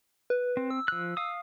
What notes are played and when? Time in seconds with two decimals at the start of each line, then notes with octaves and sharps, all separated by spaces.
0.30 B4
0.57 C4
0.71 E6
0.88 F3 F#6
1.17 F5 D#6